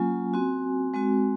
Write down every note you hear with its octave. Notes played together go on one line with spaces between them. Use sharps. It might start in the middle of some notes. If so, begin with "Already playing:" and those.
Already playing: F#3 A#3 C#4 F4 G#5
C4 F#4
G#3 C4 F#4